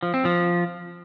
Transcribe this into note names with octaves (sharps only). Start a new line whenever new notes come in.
F3
C4
F3